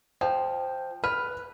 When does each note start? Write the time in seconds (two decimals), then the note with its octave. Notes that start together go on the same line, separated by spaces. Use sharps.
0.21 F3 G5
1.04 B4 F6